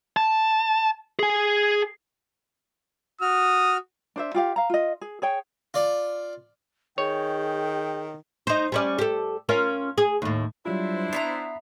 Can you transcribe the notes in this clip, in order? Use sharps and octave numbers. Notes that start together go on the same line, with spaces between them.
A5
G#4 G#5
F#4 D#6 F6
D4 C5 E5
F4 G4 F5
F5 A#5
F4 D#5
G#4
G#4 C#5 G5
F4 D5
D#3 G#4 C#5 G5
D#4 C5
G3 C#4 D5
G4 A4
C#4 F4 A#4
G#4
D#2 A2
F#3 G3 D4 E4 F4 C5
B3 E5 A#5 C7